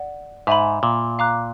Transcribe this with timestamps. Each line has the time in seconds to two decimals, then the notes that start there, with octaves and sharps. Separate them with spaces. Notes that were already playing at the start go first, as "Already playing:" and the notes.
Already playing: D5 F#5
0.47 G#2 E5 G#5 B5
0.83 A#2
1.19 F5 A#5 D6 F#6